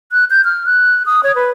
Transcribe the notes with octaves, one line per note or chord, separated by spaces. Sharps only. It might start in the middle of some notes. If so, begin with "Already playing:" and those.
F#6
G6
F6
F#6
D#6
C#5
B4